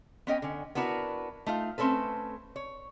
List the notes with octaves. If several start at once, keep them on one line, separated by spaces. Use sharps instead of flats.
B3 C#4 D#5 G5
D3 C#4
B3 D4 E4 F#4 A#4
A3 D#4 F4 F5
A3 C4 C#4 A4 B4
C#5